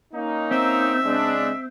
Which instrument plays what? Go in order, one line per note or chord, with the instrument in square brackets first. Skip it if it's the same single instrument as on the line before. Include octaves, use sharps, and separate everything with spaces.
[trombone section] A#3 C#4 D#4
[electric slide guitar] C4 [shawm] E5
[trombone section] C#3 G#3 D4